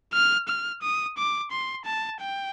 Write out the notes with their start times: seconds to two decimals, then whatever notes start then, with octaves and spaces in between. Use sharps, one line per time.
0.13 F6
0.48 F6
0.82 D#6
1.18 D6
1.51 C6
1.85 A5
2.21 G5